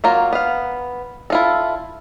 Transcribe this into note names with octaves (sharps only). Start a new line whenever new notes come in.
F#3 A#3 F4
B3 F5
E4 F4 A4